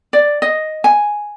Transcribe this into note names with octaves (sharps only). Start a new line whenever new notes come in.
D5
D#5
G#5